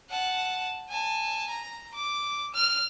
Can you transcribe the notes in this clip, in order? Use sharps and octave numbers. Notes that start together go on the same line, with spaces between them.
F#5 A5
G#5 A5
A#5
D6
F6 F7